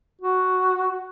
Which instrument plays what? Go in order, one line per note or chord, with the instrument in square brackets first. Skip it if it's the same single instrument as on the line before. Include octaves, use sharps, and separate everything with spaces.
[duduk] F#4